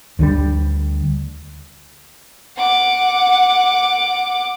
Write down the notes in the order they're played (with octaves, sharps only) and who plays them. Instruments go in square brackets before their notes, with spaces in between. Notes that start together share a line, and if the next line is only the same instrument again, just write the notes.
[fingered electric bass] D2 D3 E3 G3
[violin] F#5 D6